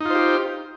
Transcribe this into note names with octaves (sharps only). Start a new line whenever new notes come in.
D#4 F4 G4 C5